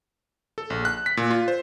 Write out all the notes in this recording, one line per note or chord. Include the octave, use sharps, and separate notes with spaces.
A4
A#1
F#6
B6
A#2
F4
C5